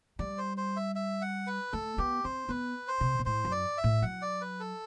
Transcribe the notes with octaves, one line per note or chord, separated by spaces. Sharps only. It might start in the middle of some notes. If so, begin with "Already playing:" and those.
G3 D5
C5
C5
E5
E5
F#5
B4
A3 A4
B3 G4
C4 C5
B3 B4
C5
C3
B2
A2 C5
F#2
D5
E5
A2
F#3 F#5
D5
B4
A4